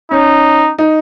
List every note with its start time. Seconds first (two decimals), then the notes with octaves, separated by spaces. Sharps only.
0.11 C#4 D#4
0.79 D#4